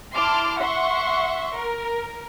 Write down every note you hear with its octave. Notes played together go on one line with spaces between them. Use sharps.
E4 A5 C6 D6 F6
E5 F#5 C6 C#6
A#4